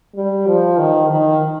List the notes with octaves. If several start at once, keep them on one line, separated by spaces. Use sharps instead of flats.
G3
F3
D#3
D#3